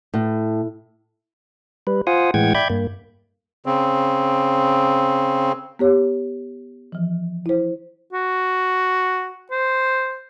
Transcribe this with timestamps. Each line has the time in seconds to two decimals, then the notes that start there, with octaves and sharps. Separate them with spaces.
0.14 A2
1.87 G3 B4
2.07 F4 C5 F5 F#5 G#5 D#6
2.34 A2 E3 G#3 F#5 G5 G#6
2.55 D5 E5 G5 B5 G6 G#6
2.70 G2 A#3
3.66 C#3 C4
5.79 B3 G4 C#5
6.92 E3 F3
7.46 E4 C5
8.13 F#4
9.51 C5